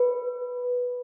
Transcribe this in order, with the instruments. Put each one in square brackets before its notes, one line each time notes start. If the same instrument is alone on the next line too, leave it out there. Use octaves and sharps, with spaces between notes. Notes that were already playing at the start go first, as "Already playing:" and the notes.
Already playing: [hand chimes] B4